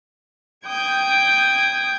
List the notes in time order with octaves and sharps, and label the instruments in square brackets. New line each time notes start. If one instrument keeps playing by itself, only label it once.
[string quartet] G5 D#6 G6 G#6